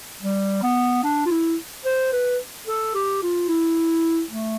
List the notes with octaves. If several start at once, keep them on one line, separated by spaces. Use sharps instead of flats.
G3
B3
D4
F4
E4
C5
B4
A4
G4
F4
E4
A3